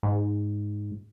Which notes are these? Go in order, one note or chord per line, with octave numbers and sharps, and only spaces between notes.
G#2